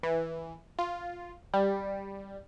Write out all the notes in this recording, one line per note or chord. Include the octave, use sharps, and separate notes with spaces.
E3
F4
G3